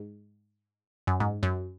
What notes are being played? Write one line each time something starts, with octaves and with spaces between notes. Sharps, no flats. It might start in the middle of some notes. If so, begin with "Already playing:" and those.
Already playing: G#2
F#2
G#2
F#2